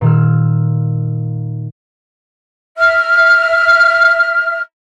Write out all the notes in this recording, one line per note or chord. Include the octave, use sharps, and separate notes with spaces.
A#2 D#3 E6 F6
E5 F6